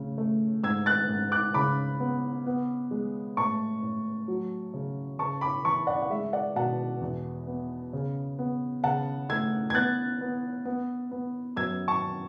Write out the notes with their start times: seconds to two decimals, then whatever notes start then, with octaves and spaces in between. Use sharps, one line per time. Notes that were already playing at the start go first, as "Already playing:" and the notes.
Already playing: A2 C#3
0.18 A3
0.63 G#2 E6 G#6
0.86 F#6 A6
1.09 G#2
1.32 D6 F#6
1.54 C#3 B5 D6
2.00 B3
2.46 B3
2.91 G#3
3.37 A2 A5 C#6
3.83 A2
4.28 F#3
4.74 C#3
5.19 C#3 A5 C#6
5.41 B5 D6
5.64 E3 A5 C#6
5.87 D5 F#5
6.02 F#5
6.10 G#3 E5
6.33 D5 F#5
6.56 B2 F#5 A5
7.01 E2
7.47 B3
7.93 C#3
8.39 B3
8.84 C#3 F#5 A5
9.29 A3 E6 G#6
9.70 G#6
9.75 B3 F#6 A6
10.21 B3
10.65 B3
11.11 B3
11.57 F#2 E6 G#6
11.88 A5 C#6